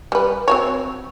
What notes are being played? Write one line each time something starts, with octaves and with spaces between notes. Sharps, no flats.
G3 B4
C4 F#4 C#5